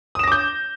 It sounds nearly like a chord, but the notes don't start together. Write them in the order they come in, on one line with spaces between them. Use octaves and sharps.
D#6 E7 A#6 D6 G6